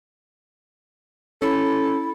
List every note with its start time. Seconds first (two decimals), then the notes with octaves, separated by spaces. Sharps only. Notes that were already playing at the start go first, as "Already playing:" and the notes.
1.42 C#4 E4 A4